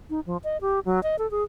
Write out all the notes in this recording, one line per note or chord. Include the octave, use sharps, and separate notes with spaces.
D#4
F3
D#5
G4
F#3
D#5
A4
G#4